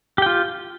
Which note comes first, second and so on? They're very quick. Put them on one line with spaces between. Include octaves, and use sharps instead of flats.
G4 G5 F4